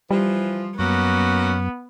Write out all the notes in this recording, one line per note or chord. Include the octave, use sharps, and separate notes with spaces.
E3 F3 G3
F#2 A#3 B3 C#4 F#4